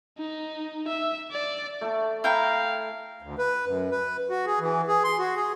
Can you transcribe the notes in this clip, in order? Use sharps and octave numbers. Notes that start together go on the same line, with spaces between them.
D#4
E5
D5
A3
E4 F5 G5 A#5
D2
B4
F#2
B4
F#4
G#4
E3
G#4
C6
F#4
G#4